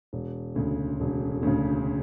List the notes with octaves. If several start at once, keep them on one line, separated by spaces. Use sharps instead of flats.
E1
D2 C#3
E1
D2 C#3